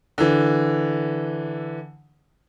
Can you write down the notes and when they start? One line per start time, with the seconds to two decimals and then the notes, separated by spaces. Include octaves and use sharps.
0.18 D3 E3